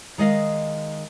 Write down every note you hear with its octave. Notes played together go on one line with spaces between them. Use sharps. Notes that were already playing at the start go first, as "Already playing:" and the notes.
D#3 G#3 D#5 F5